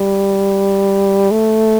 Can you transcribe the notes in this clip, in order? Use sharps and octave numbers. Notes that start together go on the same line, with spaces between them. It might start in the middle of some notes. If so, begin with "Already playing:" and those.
Already playing: G3
A3